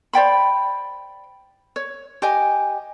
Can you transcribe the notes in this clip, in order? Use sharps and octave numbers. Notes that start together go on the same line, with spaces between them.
C5 D5 G5 B5
C#5
G4 D#5 G#5